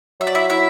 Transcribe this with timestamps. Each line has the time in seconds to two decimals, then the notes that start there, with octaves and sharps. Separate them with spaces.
0.20 F#3 E5
0.27 D5
0.35 E4 E5
0.50 E4 E5